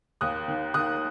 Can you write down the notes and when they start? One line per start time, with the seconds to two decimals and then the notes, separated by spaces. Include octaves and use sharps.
0.21 D#2 D#6 F#6
0.48 D#3
0.74 D#3 D#6 F#6